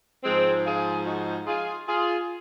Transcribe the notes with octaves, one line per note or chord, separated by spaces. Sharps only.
G#2 F3 G#3 C4
F4 G#4
D#4 F#4
F4 G#4
F4 G#4